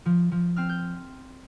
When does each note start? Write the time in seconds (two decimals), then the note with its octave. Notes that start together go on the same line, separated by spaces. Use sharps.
0.06 F3
0.32 F3
0.56 C4 F6
0.69 G6